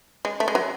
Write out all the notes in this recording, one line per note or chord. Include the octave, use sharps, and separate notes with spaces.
G#3
A3
G#3
F#3